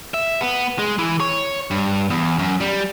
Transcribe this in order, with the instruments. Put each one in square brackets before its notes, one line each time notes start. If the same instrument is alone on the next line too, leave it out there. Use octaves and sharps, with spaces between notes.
[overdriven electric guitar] E5
B3
G#3
E3
C#5
G2
E2
F#2
G3